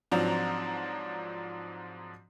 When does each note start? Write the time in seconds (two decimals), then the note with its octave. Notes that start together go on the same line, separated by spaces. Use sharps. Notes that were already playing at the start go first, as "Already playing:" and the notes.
0.12 G#2 F3 F#3 C4 D4 A#5